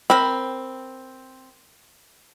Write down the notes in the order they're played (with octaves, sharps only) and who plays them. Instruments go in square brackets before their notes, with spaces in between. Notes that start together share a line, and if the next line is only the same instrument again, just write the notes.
[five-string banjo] C4 [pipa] A#4 B5